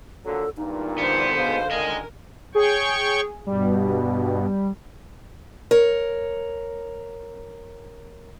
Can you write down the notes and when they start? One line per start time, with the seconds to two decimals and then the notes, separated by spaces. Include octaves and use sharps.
0.25 A#2 D3 F#3 A4
0.57 E2 G2 A#2 D#4
0.98 D3 B3 C5
1.37 G#2 B2 F5
1.71 C#2 D3 D#3 A#4 D#5 G#5
2.55 G#4 C#5 G5 C#6
3.46 G2 B2 G3
5.71 A#4 C#5